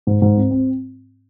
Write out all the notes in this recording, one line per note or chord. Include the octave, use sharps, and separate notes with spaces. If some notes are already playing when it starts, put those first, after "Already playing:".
G#2
G#2
C4
C4